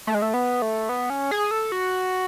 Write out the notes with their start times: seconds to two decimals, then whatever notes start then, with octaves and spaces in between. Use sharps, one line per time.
0.07 A3
0.15 G#3
0.22 A3
0.34 B3
0.62 A3
0.89 B3
1.10 C#4
1.31 G#4
1.51 A4
1.72 F#4